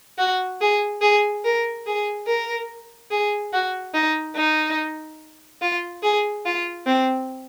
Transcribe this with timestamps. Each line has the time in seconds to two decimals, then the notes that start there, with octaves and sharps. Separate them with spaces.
0.18 F#4
0.61 G#4
1.02 G#4
1.45 A#4
1.86 G#4
2.27 A#4
3.11 G#4
3.53 F#4
3.94 D#4
4.36 D#4
5.62 F4
6.03 G#4
6.46 F4
6.86 C4